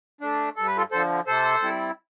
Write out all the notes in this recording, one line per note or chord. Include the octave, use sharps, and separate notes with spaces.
A3 D4
G2 A4
B4
F4 A4
D3 F3 A4 C5
C3 A4 C5
G3 C4 E4